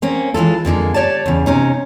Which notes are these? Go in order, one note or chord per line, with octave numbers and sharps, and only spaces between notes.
A#3 C4 C#4
E3 G#3 F4 A4
F2 D3 G#3 A#3
G4 C#5 D5 A5
E2 C#3
C3 C#4 D#4